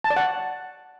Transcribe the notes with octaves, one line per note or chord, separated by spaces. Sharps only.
A5
D5
F#5